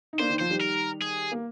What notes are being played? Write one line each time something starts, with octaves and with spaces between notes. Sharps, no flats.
D#4
A#3 D4 C5
D#3
F3 C5
D#3 G3
A#4
G#4
A#3